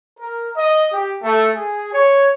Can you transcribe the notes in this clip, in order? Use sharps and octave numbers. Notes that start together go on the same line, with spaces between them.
A#4
D#5
G4
A3
G#4
C#5